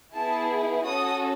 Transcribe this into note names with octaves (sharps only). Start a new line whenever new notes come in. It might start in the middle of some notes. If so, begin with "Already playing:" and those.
B3 E4 G#4 A5
C#4 F#4 A4 D#6